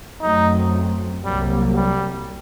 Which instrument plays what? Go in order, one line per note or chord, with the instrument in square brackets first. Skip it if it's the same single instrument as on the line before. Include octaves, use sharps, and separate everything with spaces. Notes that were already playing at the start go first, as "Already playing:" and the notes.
[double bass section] F#2 F#3 A3 C4 [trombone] D#4
[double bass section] C2 C3 F#3 A#3 [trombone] G3
[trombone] G3